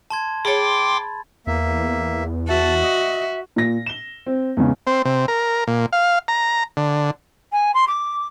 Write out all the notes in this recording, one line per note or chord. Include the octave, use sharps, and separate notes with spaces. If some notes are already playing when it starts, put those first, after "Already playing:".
A5 C6 G#6
G#4 C#5 G5 B5 C6 D6 A6
E2 A#3 E5
F#4 E5 A5
D#5
A#2 A#6
E7 G7
C4
E2 G#2 C#3
C4
C3
A#4
A#2
F5
A#5
D3
G#5
C6
D6